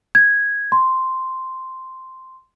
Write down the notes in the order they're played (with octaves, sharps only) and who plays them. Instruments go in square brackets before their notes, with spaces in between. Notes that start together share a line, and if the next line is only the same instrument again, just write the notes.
[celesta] G#6
C6